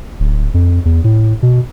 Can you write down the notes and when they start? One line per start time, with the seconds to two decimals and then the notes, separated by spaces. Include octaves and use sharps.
0.20 D1
0.54 F2
0.85 E2
1.04 A2
1.43 B2